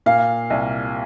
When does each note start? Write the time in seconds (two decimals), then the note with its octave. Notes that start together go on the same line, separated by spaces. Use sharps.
0.06 A#2 F5
0.50 C2